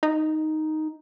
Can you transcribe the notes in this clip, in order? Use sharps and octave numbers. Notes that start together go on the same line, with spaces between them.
D#4